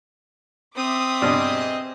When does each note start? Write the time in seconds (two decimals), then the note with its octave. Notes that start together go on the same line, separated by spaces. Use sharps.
0.76 C4 E5 D6 D#6
1.22 G2 B2 D4 G#4 C5 D#5